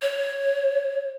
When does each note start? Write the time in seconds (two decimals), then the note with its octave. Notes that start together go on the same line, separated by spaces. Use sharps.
0.02 C#5